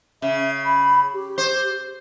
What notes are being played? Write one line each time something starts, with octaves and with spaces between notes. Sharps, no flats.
C#3 E5
B5
G4
C5